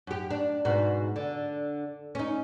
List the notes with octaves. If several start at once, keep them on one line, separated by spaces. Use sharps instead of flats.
F#2 G4
D4
G#2 B2 F#4
D3
C#4 D#4